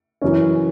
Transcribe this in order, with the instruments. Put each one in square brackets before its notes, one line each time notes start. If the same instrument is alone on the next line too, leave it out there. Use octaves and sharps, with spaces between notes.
[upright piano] F#2 E3 C#4